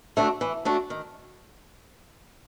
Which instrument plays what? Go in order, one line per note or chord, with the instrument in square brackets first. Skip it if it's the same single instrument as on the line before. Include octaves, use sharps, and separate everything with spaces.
[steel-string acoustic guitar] A3 D4 F#4
E3
A3 D4 F#4
D#3